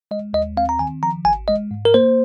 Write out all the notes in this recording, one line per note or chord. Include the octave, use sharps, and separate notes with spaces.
G#3 D#5
D#2 D#5
C4 F5
A#5
D#3 G#5
F3 A#5
G#1 G#5
G#3 D#5
G#2
A#4
A#3 C5